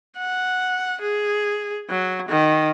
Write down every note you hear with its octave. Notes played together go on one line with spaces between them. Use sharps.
F#5
G#4
F#3
D#3